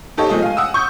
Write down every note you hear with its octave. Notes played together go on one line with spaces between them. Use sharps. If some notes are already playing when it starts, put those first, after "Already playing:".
D#4 G4 A4 C#5 D#5
F3 G#3 A3 D#5
F5 G#5
F#5 D#6 E6
C#6 G6